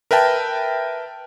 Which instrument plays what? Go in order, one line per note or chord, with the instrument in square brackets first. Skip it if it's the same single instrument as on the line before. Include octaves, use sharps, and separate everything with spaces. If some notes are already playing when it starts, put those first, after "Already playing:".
[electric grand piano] A#4 B4 E5 G5 A5